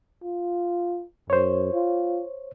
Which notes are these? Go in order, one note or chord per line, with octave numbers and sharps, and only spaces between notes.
F4
F#2 C5 C#5
F4